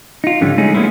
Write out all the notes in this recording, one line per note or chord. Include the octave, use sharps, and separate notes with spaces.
D#4 F4
C#2 G#2 D3 F3 G3 C#4
G#3 A3 C#4 D#4 G#4
G#3 A#3 B3 C#4 D4 E4